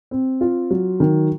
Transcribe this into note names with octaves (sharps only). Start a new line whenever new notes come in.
C4
F4
F#3
D#3